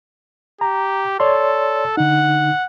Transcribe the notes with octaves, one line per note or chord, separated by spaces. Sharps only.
G4 A#5
A4 C#5 D5 C6
D3 D#4 F#5